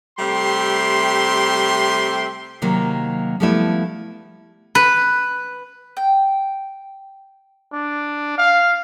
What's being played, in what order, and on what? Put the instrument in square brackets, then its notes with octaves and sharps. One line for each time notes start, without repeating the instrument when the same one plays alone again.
[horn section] C3 G3 A3 E5 G5 C6
[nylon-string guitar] C3 D#3 F#3 A#3
F3 G3 A3 B3 E4
[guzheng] B4
[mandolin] G5
[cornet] D4
F5